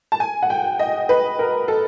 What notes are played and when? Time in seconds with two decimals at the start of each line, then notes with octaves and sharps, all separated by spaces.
0.12 A5
0.20 G#5
0.43 F#5
0.50 G5
0.79 D#5
1.09 B4
1.39 A#4
1.68 A4